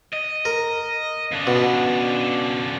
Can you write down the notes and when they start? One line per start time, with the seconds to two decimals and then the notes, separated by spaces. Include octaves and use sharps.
0.14 D#5
0.45 A#4
1.31 C#3 D4
1.47 B2